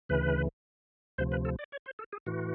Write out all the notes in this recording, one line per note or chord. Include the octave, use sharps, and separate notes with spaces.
D2 C#3 E3 B4
D2 C3 F3 C5
B4
A4
D5
C#5
C5
A4
G#4
A2 E3 F#4